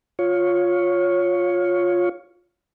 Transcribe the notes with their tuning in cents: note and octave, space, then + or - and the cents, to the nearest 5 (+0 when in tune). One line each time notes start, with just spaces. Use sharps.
F4 +15 C#5 +0